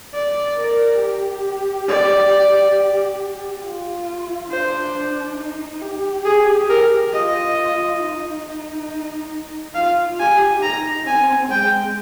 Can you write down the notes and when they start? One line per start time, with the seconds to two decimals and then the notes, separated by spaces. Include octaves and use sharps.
0.14 D5
0.57 A#4
1.01 G4
1.88 D5
3.64 F4
4.50 D4 C5
5.38 D#4
5.81 G4
6.25 G#4
6.69 A#4
7.13 F4 D#5
8.00 D#4
9.75 F4 F5
10.20 G4 G#5
10.62 D#4 A#5
11.06 C4 G#5
11.50 G#3 G5